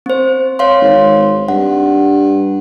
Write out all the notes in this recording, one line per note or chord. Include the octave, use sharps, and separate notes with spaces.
C4 C5
C#5 F5 C6
G#1
G2 F#5